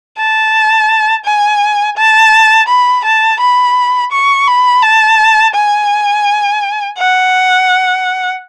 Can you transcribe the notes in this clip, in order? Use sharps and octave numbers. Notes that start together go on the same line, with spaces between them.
A5
G#5
A5
B5
A5
B5
C#6
B5
A5
G#5
F#5